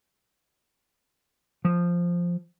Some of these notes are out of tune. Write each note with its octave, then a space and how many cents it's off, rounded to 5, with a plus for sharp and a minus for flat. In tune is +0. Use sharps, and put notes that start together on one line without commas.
F3 +0